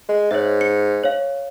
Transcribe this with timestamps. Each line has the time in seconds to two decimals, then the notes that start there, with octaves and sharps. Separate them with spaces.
0.08 G#3
0.31 G#2 C#5 E5
0.61 C#7
1.04 C#5 F5